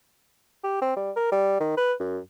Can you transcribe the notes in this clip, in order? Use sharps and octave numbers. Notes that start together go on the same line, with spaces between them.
G4
C4
G3
A#4
G3
D#3
B4
F#2